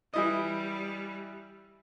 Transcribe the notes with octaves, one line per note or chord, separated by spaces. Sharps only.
E3 G3 E4 D#5